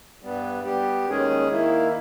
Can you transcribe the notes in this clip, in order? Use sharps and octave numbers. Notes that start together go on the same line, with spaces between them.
G2 G3 B3
G3 B3 G4
D#2 D#3 G#3 C#4 G#4
D#3 A#3 E4